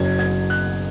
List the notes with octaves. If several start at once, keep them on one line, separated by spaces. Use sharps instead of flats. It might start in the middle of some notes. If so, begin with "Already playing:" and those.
Already playing: F#1 F#2 F#3 G#6
G#6
F#6